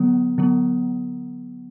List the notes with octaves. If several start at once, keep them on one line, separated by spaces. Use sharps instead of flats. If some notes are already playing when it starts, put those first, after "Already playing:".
Already playing: D3 F#3 B3
D3 F#3 B3